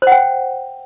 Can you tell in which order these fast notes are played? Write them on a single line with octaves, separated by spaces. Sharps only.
C5 F#5 G5